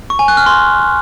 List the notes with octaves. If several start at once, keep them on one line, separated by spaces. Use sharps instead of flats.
C#6
G#5
F#6
F6
C6